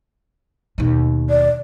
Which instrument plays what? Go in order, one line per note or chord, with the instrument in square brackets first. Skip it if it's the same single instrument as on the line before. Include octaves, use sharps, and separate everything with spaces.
[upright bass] D#2 B2
[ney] D5